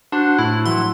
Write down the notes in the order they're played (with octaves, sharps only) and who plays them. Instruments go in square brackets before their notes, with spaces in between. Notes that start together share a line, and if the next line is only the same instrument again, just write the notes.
[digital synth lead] D4 [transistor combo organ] F#4 C5
[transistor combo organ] A2 [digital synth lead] E4
[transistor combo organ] E3 F#3 [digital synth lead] C6